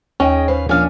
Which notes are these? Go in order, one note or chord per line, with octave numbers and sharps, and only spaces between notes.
D#2 C#4 G#4 D#5 G5
B4 C5 F5
A#1 C#4 D4 F5 G#5